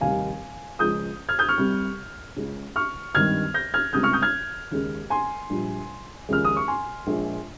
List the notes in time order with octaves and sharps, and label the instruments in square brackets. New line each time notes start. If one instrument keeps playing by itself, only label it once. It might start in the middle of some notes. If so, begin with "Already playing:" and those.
[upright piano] F1 D#2 D#3 G3 F5 G#5
C#2 C#3 F3 G#3 D#6 G6
F6 G#6
D#6 G6
C#6 F6
C2 C3 G3
C#2 C#3 G#3
C#6 F6
G#1 G2 D#3 G3 F6 G#6
G6 A#6
F6 G#6
C#2 C3 G3 D#6 G6
C#6 F6
D#6 G6
F6 G#6
D#2 C#3 G#3
G#5 C6
A#1 A#2 G3
D#2 C#3 F3 G#3 F6
D#6
C#6
G#5 C6
A#1 A#2 G#3